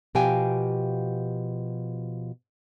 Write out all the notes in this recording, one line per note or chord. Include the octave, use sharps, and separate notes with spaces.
B2 F3 G4 F5 G5 G#5